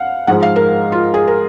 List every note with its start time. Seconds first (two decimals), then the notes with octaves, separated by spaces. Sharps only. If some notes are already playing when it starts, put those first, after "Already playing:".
Already playing: F5 F#5
0.27 G#2 F3 G#3 F#5
0.43 F5
0.56 A#4
0.92 F4
1.14 G#4
1.27 A#4